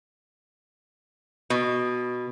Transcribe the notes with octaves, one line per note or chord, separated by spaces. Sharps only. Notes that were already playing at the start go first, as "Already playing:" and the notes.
B2